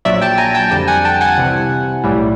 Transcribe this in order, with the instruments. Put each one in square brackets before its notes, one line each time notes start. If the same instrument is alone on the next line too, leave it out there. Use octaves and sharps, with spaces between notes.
[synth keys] A#1 A#2 F#3 D5 E5
G5 A5
G#5 A#5
G5 A5
F2 D3 G3 G5 A5
F#5 G#5
G5 A5
F#5 G#5
C2 C3 E3
B1 A2 E3 G3